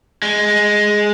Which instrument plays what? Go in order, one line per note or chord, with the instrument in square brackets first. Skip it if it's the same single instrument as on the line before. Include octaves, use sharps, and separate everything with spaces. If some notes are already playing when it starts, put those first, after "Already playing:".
[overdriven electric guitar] G#3